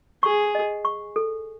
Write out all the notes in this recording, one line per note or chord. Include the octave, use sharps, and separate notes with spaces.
G#4 C#6
D#5
C#6
A4